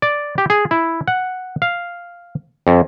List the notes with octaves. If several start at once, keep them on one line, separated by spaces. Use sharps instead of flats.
D5
G4
G#4
E4
F#5
F5
F2